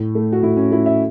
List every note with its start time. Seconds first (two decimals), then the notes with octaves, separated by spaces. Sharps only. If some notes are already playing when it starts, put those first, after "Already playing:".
Already playing: A2
0.15 A3
0.33 F#4
0.43 A2 E4
0.57 C#4
0.71 A3 E4
0.86 E5